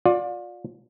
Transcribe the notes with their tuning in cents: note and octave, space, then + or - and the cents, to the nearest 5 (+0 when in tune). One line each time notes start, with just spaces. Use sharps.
F4 +35 D5 +0